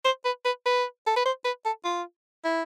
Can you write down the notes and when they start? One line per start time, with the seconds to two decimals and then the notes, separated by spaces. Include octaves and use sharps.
0.05 C5
0.25 B4
0.45 B4
0.66 B4
1.07 A4
1.16 B4
1.25 C5
1.45 B4
1.65 A4
1.85 F4
2.45 E4